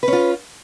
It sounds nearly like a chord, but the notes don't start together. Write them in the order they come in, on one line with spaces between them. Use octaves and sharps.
B4 C#4 F4